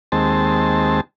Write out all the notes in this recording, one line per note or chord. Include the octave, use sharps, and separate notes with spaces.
D#2 G#3 C4 A5